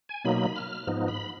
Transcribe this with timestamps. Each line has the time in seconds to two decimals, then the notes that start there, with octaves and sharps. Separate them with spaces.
0.09 G#5
0.24 B2 F#3 A#3 D#4 B5
0.56 F6
0.87 G#2 F3 B3 D#4
1.08 B5